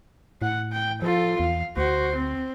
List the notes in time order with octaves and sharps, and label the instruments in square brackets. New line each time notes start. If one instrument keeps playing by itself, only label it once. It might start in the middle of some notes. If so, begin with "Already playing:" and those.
[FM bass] A2 [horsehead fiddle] F#5
[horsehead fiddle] G5
[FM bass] F3 [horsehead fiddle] F4 A4
[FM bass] E2 [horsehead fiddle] F5
[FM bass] D2 [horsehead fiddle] F#4 C5
[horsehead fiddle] C4